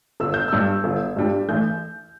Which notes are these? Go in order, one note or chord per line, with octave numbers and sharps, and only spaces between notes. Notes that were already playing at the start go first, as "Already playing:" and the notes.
G1 E6
G6
G2 G3 D4 E6
G1
G2 G3 D4
A1 G6